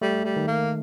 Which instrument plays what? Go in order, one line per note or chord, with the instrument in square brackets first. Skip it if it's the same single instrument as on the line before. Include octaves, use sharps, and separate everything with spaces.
[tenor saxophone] G3 [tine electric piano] A3
[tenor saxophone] G3
[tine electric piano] D#3
[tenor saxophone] A#3